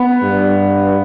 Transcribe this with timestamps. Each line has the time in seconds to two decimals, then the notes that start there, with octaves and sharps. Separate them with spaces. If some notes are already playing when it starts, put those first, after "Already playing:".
Already playing: B3
0.23 G2